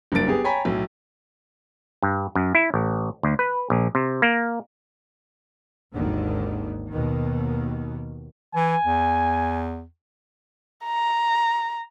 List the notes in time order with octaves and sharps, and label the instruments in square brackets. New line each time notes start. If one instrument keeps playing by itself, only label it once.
[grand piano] F#1 G2 A#3 D4 A6 D7
B3 G4 G#4
C#5 G5 G#5 A#5 B5 B6
B1 A2
[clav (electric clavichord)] G2
F#2
E4
A1
D2
B4
A#1
C3
A#3
[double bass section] G#1 D#2 D3 D#3
D#2 B2 D#3
[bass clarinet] E3 [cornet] G#5
[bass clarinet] E2
[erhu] A#5